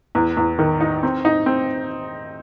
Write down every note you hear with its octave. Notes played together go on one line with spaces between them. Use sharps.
E2
E2
D#3
D#4
C4
D#4
C4